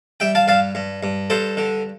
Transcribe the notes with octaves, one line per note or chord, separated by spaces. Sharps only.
G3 E5 G5
F5 A5
G2 F5 A5
G2
G2
G2 A4 C5
D3